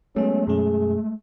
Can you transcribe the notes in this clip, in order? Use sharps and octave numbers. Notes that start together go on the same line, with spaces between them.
F#3 G#3 A3 B3 C#4
F#2 B2 C#4 G#4